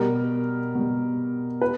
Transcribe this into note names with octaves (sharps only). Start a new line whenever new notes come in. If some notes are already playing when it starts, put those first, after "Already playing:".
Already playing: B2 G3 A#4
B2 G3
B4